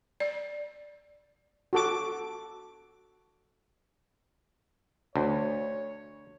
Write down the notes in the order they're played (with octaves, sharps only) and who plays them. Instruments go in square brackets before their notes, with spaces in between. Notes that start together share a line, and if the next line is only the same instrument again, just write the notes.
[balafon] D5
[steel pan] F#4 A4 D6
[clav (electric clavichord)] D2 [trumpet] C#5